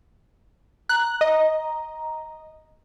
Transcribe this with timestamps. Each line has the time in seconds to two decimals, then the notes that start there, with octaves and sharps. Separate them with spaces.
0.89 A#5 F#6
1.21 D#5